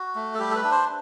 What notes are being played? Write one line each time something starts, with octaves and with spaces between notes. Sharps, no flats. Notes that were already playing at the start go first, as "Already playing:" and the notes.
Already playing: F#4
A3
A4
G3 G4
A4
B4
D4
C5